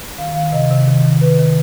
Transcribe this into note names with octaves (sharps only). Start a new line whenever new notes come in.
D#3 F5
D#3 F5
C3 D#5
C3
D#3
D#3
D#3 B4
D#3